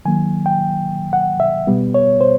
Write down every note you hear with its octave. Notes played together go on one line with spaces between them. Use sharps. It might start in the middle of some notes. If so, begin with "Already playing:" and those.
D#3 F#3 A#3 G#5
G5
F#5
E5
B2 G3 B3
C#5
C5